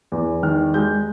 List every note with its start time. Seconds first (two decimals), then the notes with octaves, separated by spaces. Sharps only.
0.12 E2
0.43 D#3 F6
0.74 G#3 G6